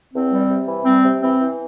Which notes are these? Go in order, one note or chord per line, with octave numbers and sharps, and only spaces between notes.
E2 C4
G3
C3
E3
G3 C4
C3
E3 C4
E3